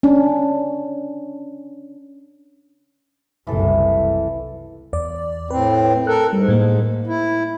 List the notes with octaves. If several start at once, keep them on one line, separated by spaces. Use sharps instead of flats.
C#4 D4
F#1 C2 E3 A4
E2 D5
A2 C4 B4
A4 A#4 F#6
G#2 G3
A2 A#3
E4